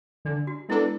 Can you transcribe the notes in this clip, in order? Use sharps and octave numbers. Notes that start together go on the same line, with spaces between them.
D3 D4
F#4
G#3 B3 D4 E4 A4